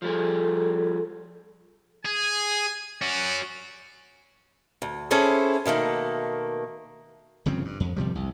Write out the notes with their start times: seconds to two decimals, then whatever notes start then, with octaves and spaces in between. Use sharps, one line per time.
0.02 F3 G3 G#4 A4
2.05 G#4 G#5
3.01 C#4 F#4 D5
4.82 D2
5.11 C#4 E4 G#4 A4 C5
5.66 B2 D#3 A3 A#3
7.46 G1 C#3 F3 C4
7.65 G2
7.80 F2
7.96 G1 C3 F3 G3
8.15 C2